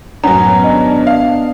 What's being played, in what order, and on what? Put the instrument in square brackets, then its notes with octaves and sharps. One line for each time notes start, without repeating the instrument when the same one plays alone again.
[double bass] F#2 A2 [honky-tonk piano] F#3 C#4 [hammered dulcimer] B3 [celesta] A#5
[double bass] G#1 D4 [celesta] D#5
[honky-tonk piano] F5